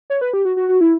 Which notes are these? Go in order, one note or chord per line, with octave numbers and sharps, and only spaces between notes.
C#5
B4
G4
F#4
F#4
F#4
E4